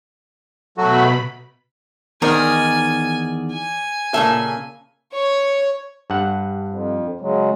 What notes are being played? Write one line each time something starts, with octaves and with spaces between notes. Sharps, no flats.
B2 F#3 A3 F#4 B5
E2 D#3 A#4 C5 D5 D#5 G#5
G#5
A#2 C#3 A4 E5
C#5
G2 F#5
F2
C#3 F#3 G#3